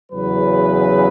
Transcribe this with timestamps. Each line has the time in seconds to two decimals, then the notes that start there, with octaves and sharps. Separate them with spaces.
0.12 E2 C#3 F#3 B4